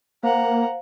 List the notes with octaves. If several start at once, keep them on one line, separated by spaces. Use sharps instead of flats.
A#3 C5 F5 F#5 A#5